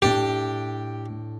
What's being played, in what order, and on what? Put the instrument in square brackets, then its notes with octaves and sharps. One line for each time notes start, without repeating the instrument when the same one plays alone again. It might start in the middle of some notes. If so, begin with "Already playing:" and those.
[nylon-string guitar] A2 D4 [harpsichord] G4